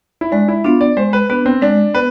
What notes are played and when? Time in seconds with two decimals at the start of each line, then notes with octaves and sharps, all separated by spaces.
0.21 E4
0.32 G#3 D4
0.48 E4
0.64 B3 D4 F4
0.81 D5
0.97 G#3 C5
1.13 B4
1.30 B3 D4 B4
1.46 C4
1.61 G#3 D4
1.94 B3 B4